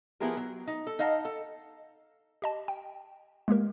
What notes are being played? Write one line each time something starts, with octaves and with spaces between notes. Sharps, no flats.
F3 B3 E4 G4 G#4 A#4
F#3
D#4
A4
D#4 D#5 F5 F#5 A5
A4
G4 D#5 A5
G5
G#3 A#3 G4 A#4